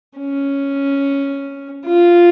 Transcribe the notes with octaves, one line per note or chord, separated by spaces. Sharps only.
C#4
F4